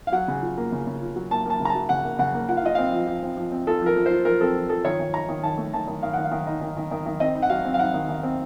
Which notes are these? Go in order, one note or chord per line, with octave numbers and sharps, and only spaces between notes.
F5
F#3 F#5
C#3
F4
A#3
C#3
C#3
F4
F#3
A#3 A5
A#3 A5
C#3
A#5
A5
F#3
C#3 F#5
A#3
C#3 F#5
A#3
F4 F#5
F5
F4 D#5
C4 F5
F3
F3
C4
F3
C4
F4 A4
F3 A#4
F3
F4 C5
F3 A#4
C4 A4
F3
F3 A4
D#3 C#5
D#3
D#4 A#5
D#3
D#3 A5
A3
D#3 A5
D#3
D#3 F5
D#3 F#5
F5
D#3
D#4
D#3
D#3
D#3
D#3
C4 D#5
D#4
F#5
F#3 F5
C4
F5
D#4 F#5
D#3
D#3
C4